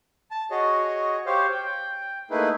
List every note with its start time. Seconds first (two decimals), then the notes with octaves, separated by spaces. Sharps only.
0.31 A5
0.51 F#4 G#4 C#5 D#5
1.26 G4 C5 C#5 F5
1.52 G5
2.31 A3 A#3 D#4 E4 G#4 B4